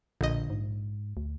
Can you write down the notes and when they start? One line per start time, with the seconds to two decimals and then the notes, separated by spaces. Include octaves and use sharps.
0.21 A#1 D3 D#5
0.50 G#2
1.17 D2